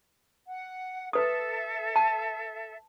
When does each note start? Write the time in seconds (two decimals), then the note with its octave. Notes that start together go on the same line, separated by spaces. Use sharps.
0.46 F#5
1.13 A4 B4 E5 D#6
1.96 A5